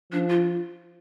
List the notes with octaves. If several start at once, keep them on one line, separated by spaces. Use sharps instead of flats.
F3 D4
F4